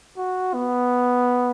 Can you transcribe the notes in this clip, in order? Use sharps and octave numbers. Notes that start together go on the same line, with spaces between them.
F#4
B3